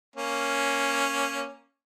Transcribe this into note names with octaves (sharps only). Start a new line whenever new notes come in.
A#3 C#4